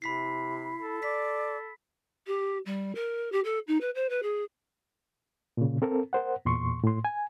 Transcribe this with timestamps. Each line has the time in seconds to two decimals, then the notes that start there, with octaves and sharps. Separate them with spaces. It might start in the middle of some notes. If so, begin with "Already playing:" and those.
0.02 C3 E4 B5 B6 C7
0.82 A4
1.03 D5 B6
2.27 G4
2.66 G3
2.95 A#4
3.32 G4
3.44 A4
3.68 D#4
3.81 B4
3.95 C5
4.09 B4
4.23 G#4
5.57 A#2 C#3
5.82 C4 A4 A#4
6.13 A#4 C5 F#5
6.45 E2 A#2 C6 C#6
6.84 A2 C6
7.05 G#5